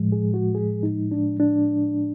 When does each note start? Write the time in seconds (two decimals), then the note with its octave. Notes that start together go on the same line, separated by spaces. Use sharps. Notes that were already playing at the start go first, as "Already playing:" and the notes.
Already playing: A2 F3 G#3
0.12 G#4
0.34 F#4
0.55 G#4
0.83 D#4
1.11 D4
1.40 D4